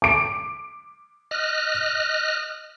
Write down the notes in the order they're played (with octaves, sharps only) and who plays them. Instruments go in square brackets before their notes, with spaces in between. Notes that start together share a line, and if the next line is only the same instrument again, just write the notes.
[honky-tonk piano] D6 D7
[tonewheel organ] D#5 F6 F#6